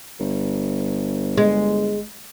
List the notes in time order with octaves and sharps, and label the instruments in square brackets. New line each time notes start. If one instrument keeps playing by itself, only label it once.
[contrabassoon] G1
[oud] G#3